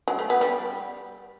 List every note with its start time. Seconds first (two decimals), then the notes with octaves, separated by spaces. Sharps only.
0.08 F#3
0.19 A3
0.30 B3
0.41 G3